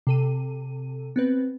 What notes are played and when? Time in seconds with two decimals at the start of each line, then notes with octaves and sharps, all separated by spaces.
0.07 C3 A4 D#7
1.16 B3 C4 B4